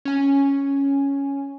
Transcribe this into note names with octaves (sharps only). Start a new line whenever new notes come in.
C#4 G#5